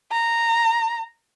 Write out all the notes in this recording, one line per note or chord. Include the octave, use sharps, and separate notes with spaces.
A#5